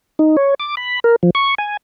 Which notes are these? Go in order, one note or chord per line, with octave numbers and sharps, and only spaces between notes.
D#4
C#5
D6
B5
A#4
F3
C#6
G#5